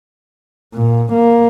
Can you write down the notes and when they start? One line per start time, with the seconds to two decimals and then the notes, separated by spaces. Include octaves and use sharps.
0.75 A#2
1.14 A#3